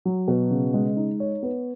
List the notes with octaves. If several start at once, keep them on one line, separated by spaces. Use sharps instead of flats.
F#3
B2
C#3
G#3
D#4
C#5
B3